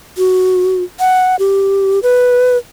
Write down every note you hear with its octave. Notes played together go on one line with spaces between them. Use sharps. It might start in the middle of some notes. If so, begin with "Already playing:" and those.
F#4
F#5
G4
B4